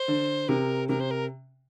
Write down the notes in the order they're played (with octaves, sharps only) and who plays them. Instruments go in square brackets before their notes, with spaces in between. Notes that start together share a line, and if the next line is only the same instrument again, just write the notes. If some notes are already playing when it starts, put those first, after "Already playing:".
Already playing: [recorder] C5
[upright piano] D3
[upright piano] C3 [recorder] A#4
[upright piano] C3 [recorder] A#4
[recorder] C5
A#4